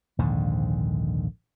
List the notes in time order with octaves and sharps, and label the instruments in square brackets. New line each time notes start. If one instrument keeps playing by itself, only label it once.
[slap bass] A#1 D#2 G#2 D3